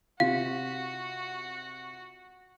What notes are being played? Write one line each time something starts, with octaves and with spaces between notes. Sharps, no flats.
C3 F4 F#4 F5